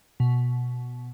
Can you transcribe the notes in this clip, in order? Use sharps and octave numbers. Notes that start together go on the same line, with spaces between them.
B2